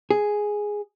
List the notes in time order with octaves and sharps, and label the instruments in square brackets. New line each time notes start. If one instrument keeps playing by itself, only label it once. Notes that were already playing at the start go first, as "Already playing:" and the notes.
[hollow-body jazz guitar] G#4